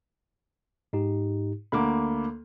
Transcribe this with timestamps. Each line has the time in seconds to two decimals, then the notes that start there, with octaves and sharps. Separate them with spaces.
0.93 G#2 D#4 G4
1.72 D2 A#3 B5 D6